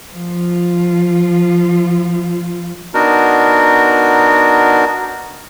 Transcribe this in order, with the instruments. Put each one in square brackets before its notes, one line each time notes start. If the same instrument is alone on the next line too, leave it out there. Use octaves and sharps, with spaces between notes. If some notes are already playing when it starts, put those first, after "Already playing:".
[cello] F3 F4
[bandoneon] B3 D4 D#4 F#4 A#4